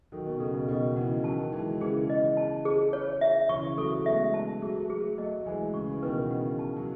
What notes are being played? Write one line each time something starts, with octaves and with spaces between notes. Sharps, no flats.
D#3 F#3 A4
B2
C#3 A4
B2
B2 D#3 D#5
C#3 E3 F#5
D#3 F#3 A5
E3 G#3 D#4
C#3 E3 G#4
D#5
A5
G#4
C#5
E5
C#3 E3 C#6
F#3 A3 A4
G#3 B3 E5
A5
F#3 A3 G#4
G#4
F#3 A3 D#5
E3 G#3 G#5
C#3 C#6
E3
B2 D#3 B4
C#3 F#5
A5
F#3